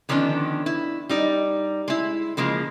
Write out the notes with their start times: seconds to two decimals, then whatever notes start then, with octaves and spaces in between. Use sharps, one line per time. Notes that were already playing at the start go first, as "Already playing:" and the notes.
0.09 D3 D#3 F3 B3 C#4 D4
0.66 E4
1.09 G3 D#4 D5
1.88 G#3 E4
2.37 C#3 F3 G#3 A#3